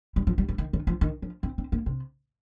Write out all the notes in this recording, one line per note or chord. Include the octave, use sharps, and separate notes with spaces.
G3
F3
G3
G3
D#3
D#3
F3
D#3
F3
C4
C4
A#3
C3